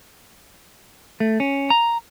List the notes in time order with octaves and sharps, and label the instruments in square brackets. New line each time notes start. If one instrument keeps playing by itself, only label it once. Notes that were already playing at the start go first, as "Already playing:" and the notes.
[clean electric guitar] A3
C#4
A#5